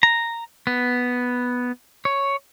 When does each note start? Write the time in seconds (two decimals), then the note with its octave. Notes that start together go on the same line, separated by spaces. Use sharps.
0.03 A#5
0.67 B3
2.05 C#5